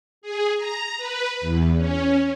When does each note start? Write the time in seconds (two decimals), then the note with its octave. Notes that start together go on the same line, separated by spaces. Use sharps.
0.22 G#4
0.56 A#5
0.97 B4
1.41 E2
1.77 C#4